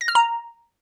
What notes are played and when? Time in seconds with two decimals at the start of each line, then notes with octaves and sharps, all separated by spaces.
0.01 A#6
0.08 F6
0.15 A#5